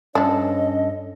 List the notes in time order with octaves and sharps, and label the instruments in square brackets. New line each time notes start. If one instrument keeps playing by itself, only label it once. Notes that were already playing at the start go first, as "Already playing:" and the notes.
[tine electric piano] G2 A4 [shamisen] F3 D4 [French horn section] C#4 [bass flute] D#5